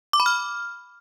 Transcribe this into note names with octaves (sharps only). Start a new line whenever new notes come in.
D6
B5
F6